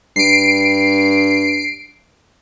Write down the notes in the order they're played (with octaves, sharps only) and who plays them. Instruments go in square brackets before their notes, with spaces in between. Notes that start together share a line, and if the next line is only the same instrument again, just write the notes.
[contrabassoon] G2 [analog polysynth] C7 D7